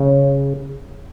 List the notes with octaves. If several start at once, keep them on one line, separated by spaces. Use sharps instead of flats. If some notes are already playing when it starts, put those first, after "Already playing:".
Already playing: C#3